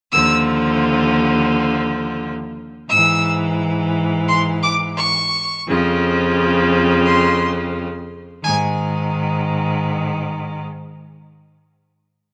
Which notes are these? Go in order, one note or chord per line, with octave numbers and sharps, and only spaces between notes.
D#2 D3 F3 E6
G#2 E3 E6
C6
D6
C#6
F2 C#3 F3
C6
G#2 D#3 G#5